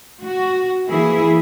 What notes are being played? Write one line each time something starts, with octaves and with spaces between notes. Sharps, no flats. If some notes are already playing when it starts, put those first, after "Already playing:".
F#4
E3 A#3 E4 G#4